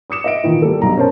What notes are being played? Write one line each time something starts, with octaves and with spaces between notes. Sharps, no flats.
D6 D#6 C#7 E7
D#5 E5 D7
A#2 D#3 E3
G3 A#3 A4
B1 G2 A#5
C#4 A#4 C5 A5